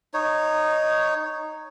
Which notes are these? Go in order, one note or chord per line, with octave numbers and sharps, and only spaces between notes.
D#4 C#5